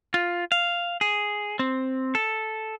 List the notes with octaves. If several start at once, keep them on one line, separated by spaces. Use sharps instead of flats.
F4
F5
G#4
C4
A4